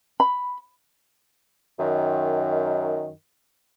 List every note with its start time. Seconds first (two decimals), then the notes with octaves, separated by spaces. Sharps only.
0.20 B5
1.79 F#2 D#3